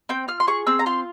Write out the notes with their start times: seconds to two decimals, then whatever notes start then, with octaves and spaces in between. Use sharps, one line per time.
0.09 C4 G5
0.28 F4 F6
0.40 C6
0.47 G#4 C#6
0.67 C4 E6
0.79 A#5
0.86 F4 C6